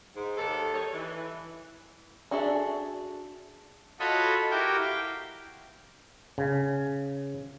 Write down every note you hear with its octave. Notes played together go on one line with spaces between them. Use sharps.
G#2
D#2 D#3 A4
D#3 G3 D#4 C#5
E3
D4 F#4 G#4 A4 E5
F4 F#4 A4 C#5 D#5 B5
E4 F#4 G4 A#4 G5
F5 G5
C#3